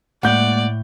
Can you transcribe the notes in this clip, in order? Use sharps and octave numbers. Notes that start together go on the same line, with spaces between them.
A2 G#3 A#3 D5 F#5 G6